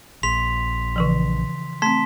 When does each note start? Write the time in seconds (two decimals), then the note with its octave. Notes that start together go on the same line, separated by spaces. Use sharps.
0.23 A#1 C6 B6 F7
0.96 C#3 E3 F3
1.82 A3 C4 A5 C6 B6